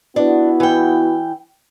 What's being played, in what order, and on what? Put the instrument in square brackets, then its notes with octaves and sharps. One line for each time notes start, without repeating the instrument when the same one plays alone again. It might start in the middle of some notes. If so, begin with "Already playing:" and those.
[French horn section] B3 E4 F#4 [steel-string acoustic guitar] D4
[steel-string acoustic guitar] E3 G5